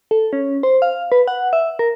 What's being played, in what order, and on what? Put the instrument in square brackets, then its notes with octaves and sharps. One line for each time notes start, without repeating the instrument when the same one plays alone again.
[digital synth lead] A4
C#4
C5
F5
B4
F#5
E5
A#4